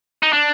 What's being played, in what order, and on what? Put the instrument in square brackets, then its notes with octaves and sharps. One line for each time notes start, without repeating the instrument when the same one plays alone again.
[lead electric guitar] D#4
D4